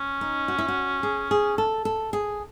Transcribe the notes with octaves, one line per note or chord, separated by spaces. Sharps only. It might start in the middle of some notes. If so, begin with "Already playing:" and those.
Already playing: C#4
D#4
F#4
E4
F#4
G#4
G#4
A4
A4
G#4